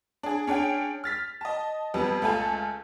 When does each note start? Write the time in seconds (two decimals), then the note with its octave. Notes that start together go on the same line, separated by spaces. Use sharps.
0.23 D4 G#4
0.47 C#4 D4 G#4 G5
1.04 F6 A6 B6
1.41 D#5 A5
1.94 F2 G3 B3 A5
2.22 C#2 A3 F4 A4 G#5 A5